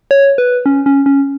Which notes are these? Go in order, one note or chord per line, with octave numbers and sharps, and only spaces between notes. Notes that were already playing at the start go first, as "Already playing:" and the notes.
C#5
B4
C#4
C#4
C#4